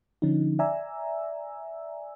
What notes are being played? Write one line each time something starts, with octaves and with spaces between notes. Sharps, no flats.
D3 F3 C#4 D#4
D5 E5 G#5 A#5 E6